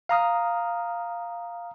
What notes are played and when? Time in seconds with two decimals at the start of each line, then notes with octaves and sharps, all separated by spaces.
0.09 F5 A#5 D#6 F6